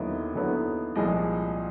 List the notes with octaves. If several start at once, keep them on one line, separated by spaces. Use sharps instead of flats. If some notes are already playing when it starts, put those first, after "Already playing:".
Already playing: D#2 D3 F#3 B3 E4 D#5
D#2 D3 F#3 B3 E4
C2 A#2 F3 G#3 D#5